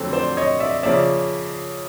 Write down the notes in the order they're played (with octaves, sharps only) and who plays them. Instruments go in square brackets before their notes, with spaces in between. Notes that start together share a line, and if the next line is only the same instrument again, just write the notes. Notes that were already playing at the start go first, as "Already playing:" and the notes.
Already playing: [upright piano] F2 D3 F#3 A3 C4
C5 D5
C#5 D#5
D5 E5
C#3 F3 A#3 C#4 D5 E5